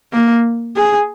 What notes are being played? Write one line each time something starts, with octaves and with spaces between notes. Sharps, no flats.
A#3
G#4